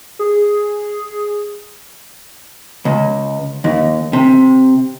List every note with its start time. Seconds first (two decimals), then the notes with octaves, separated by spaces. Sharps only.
0.19 G#4
2.85 C#2
3.64 D#2
4.13 C3